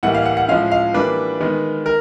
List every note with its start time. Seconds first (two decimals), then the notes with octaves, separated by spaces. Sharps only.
0.03 A2 E3 G3 A#3 F#5
0.15 F5
0.26 F#5
0.37 F#5
0.48 A2 F3 G#3 C#4 F5
0.72 F5
0.94 E3 G3 A#3 D4 B4
1.40 D#3 G#3 B3
1.86 A#4